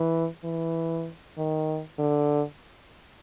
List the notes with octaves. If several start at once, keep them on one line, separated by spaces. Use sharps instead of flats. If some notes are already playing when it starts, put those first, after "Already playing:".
Already playing: E3
E3
D#3
D3